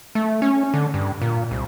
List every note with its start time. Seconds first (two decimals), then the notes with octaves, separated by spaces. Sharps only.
0.15 A3
0.42 C#4
0.74 D3
0.94 G2
1.22 A#2
1.51 C2